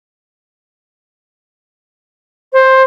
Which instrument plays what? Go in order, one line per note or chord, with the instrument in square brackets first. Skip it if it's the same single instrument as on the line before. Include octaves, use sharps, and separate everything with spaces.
[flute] C5